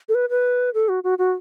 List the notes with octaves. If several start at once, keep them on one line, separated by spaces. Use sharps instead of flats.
A4
B4
B4
A4
F#4
F#4
F#4